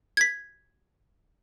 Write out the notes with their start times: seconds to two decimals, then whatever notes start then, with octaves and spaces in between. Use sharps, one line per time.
0.17 G#6 B6